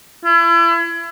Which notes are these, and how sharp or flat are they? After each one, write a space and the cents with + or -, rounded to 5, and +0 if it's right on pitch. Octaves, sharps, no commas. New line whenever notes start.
E4 +35